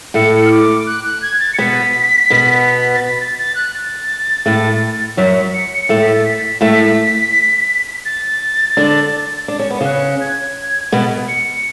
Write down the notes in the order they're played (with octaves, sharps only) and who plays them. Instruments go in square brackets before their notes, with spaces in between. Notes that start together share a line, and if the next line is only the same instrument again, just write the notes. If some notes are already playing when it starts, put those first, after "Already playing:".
[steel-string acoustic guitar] A2 A3 [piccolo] C#7
[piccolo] F6
D6
F#6
F#6
G#6
A6
C#7
[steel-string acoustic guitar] B2 B3 [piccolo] B6
[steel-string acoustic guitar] B2 B3
[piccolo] A6
B6
A6
A6
F#6
A6
[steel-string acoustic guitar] A2 A3
[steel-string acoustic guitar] F#2 F#3 [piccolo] B6
[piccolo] C#7
[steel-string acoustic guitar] A2 A3 [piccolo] C#7
[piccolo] B6
A6
B6
[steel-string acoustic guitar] A2 A3 [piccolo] B6
[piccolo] A6
[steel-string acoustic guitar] D3 D4
D4
C#4
B3
[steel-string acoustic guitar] C#3 C#4 [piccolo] F#6
[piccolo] G#6
[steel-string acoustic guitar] B2 B3
[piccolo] C#7